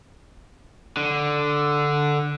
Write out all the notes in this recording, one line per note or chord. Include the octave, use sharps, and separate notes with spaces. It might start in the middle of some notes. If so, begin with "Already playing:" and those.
D3